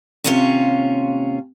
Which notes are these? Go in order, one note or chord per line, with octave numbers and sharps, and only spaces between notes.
D#2 C3 C#4 E4 F4 C#5